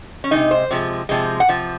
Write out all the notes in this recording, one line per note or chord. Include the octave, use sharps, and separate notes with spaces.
C#4
C3 F3 G#3 D#4
C5
C3 F3 G#3
C3 F3 G#3
F#5
C3 F3